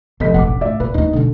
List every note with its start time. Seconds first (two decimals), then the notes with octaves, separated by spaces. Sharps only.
0.20 F1 G#2 D#5 B6
0.34 E1 A1 F#5 D6
0.61 A2 D5 E5 F5
0.80 A#2 B4
0.94 D#2 C4 D#4
1.13 B2 D3 G3